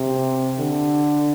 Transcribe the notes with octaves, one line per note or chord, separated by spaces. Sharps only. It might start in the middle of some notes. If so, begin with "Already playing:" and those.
Already playing: C3
D3